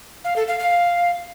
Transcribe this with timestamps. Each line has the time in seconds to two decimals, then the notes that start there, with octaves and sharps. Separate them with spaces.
0.24 F5
0.36 A4
0.48 F5
0.59 F5